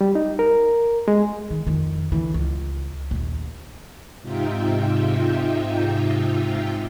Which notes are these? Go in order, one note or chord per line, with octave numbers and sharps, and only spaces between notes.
G3
D#4
A#4
G#3
D#3
F2 D#3
D3 E3
C#2
A#1 D#2
G#2 C3 D#4 F4 E5 G5